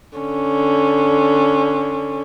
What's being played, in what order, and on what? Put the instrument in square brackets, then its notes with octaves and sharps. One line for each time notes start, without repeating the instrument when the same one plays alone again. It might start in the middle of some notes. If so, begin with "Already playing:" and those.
[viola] D3 C#4